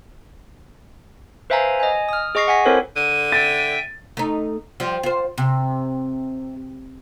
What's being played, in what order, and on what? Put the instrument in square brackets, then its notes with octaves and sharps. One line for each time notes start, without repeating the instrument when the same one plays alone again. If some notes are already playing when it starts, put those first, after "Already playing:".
[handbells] B4 C5 E5 F5 G#5 A#5
D#5 G#5
D#6 F6
G#4 D#5 C#6 A#6 C7
F#5 G#5 B6
C4 E4 A4 A#4 C5 C#5
[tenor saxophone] D3 [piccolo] D#7
[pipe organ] E5 G5 [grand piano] A6
[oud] A3 D#4
F3 G3
F4 C5
C3